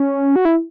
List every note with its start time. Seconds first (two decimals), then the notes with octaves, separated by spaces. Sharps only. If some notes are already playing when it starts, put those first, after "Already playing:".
Already playing: C#4
0.36 F#4
0.45 E4